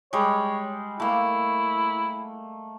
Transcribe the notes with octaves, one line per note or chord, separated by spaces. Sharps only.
G3 G#3 C#5
A3 A#3 E4